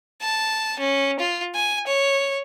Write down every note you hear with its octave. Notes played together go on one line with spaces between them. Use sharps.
A5
C#4
F4
G#5
C#5